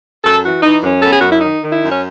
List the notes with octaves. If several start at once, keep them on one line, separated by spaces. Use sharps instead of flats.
F#2 A4
E3 F#4
E3 D#4
F#2 C#4
B3 A4
G#4
F#2 F#4
E4
D#3 D#4
D#3
E4
F#2
C#4